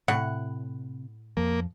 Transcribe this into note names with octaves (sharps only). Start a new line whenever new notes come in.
A2 C3 F#5
F2 F3 A#3